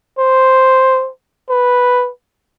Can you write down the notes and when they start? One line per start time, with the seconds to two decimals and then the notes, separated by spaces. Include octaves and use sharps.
0.19 C5
1.49 B4